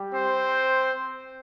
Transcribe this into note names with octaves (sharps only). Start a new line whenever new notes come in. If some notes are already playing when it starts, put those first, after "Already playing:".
Already playing: G3 G4
C4 C5